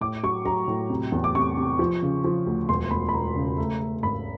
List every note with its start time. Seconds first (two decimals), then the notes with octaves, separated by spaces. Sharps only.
0.01 A2 D6
0.23 F#3 C#6
0.45 F#3 A#5
0.68 A2
0.90 C3
1.12 E2
1.24 D6
1.35 C3 C#6
1.57 C3
1.79 F3
2.02 C#3
2.24 F3
2.47 D2
2.69 E1 C6
2.91 E1 B5
3.09 B5
3.13 E1 A#5
3.36 C#3
3.58 A3
3.80 A3
4.03 G#1 B5